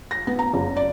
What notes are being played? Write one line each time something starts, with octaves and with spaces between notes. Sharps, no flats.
A#6
B3
A#5
F#1
D5